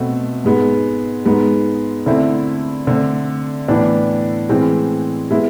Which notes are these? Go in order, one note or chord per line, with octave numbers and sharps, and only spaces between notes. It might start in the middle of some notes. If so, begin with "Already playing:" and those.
Already playing: B2 A3 C4
G#2 G#3 B3
G#2 G#3 B3
D3 A3 C4 E4
D3 A3 C4
A2 E3 B3 D4
A2 E3 G#3 C4
G#3 B3 E4